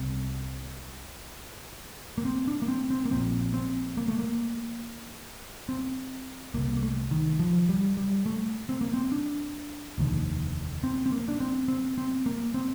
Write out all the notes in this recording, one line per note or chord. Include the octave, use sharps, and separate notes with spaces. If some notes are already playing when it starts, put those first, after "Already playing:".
Already playing: C2 C3 C4
A#3
C4
D4
A#3
C4
C4
A#3
A#1 A#2 C4
C4
A#3
A3
A#3
C4
C2 C3 A#3
A#3
A3
D#3
F3
G3
G3
A3
C4
A#3
C4
D4
F1 D#2 D3
C4
C4
A#3
D4
C4
C4
C4
A#3
C4